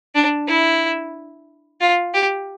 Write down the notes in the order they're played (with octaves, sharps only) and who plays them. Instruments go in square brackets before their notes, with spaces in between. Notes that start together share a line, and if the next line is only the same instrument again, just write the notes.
[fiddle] D4
E4
F4
G4